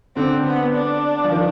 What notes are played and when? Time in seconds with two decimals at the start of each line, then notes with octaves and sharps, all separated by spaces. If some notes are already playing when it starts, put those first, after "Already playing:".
0.16 D3 C4
0.46 B3
0.74 D4
1.24 F3
1.32 D#3